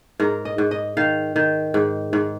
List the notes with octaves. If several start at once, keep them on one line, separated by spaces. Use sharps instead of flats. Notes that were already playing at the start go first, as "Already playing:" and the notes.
G#2 A#4
D#5
G#2
D#5
D#3 F5
D#3
G#2
G#2